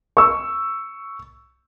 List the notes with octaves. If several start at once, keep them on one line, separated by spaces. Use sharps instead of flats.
C#6 E6